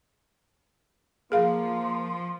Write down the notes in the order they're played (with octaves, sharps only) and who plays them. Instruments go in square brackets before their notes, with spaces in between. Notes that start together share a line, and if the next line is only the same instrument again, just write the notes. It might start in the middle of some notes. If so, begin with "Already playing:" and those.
[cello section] F3 [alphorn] A#3 [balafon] G#4 F5 [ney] C6